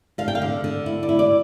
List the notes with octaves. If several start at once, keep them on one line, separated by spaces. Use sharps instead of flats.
D3 F5
G5
F5
D3
D3
E4
D5
E4
D5